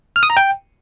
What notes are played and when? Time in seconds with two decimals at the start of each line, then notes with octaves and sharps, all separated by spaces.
0.16 F6
0.23 D#6
0.30 A#5
0.37 G5